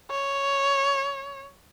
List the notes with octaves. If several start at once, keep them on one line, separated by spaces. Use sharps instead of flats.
C#5